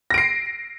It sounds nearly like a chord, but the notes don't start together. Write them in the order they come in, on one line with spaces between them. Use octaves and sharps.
A#6 D7 C7